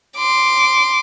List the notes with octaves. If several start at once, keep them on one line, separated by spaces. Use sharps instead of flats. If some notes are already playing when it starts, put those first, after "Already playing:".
C6 D6